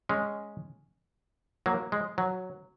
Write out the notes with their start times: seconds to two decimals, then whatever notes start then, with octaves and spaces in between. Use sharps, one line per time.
0.09 G#3 C#4
1.66 F#3 A#3
1.92 G#3
2.18 F#3